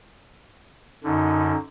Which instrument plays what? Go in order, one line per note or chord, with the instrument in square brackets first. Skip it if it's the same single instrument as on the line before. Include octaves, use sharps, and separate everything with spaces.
[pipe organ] F#2 D3 [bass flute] D#4